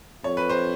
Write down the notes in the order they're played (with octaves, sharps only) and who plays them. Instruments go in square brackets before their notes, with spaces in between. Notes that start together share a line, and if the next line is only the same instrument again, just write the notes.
[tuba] F2 [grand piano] C#5
[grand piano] B4
C5